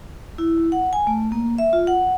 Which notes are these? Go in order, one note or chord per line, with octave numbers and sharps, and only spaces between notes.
E4
F#5
G#5
A3
A#3
E5
F4
F#5